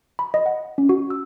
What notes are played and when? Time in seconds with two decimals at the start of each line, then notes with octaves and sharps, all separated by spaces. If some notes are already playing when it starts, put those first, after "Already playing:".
0.19 B5
0.34 D#5
0.46 F#5
0.78 C#4
0.89 F#4
1.10 E6